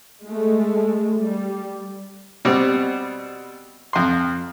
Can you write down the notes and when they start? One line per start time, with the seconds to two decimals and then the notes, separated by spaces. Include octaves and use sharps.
0.25 G#3 A3
1.22 G3
2.45 B2 G3 C4
3.93 F2 C6